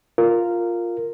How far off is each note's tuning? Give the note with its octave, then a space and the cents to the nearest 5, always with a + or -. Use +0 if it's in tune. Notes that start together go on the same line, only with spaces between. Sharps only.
F4 +0 A#4 -10